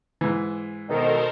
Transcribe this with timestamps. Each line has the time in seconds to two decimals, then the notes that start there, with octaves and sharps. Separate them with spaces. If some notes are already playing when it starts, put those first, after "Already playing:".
0.21 G#2 E3
0.89 B2 D#3 A4 A#4 C5 D#5